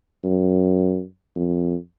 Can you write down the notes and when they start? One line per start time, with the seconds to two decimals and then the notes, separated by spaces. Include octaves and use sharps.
0.24 F#2
1.36 F2